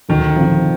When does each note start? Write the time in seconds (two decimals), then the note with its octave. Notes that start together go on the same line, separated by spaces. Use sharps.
0.09 D2 D#3
0.36 C3 F3